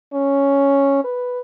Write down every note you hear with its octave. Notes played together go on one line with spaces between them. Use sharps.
C#4
B4